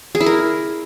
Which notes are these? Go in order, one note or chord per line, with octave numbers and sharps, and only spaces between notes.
G#4
E4
A#4